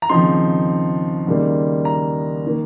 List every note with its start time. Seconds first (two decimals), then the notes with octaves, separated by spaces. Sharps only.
0.02 A#5
0.09 D#2 C#3 F3 C4 D#4 C6
1.27 D#2 C#3 G3 A#3 D#4
1.85 A#5
2.46 D#3 A#3